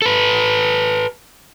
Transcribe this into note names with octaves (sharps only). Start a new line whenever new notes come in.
A4 B4